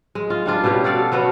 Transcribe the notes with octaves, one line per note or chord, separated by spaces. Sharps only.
G#3
F4
G3 D4 F4
B2 G3 C#4 G4
F#4 A4 D5 F5
A3 B3 C#4 F#4